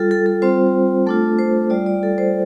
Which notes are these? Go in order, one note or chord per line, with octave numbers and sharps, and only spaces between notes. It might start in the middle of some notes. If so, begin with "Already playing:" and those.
Already playing: G3 F4 A4
A4
A4
G3 C4 F4 C5
A3 D4 F4 A4
C5
G3 F4 D5
D5
A4
C5